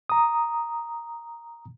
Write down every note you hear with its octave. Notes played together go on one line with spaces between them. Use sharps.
A#5 D#6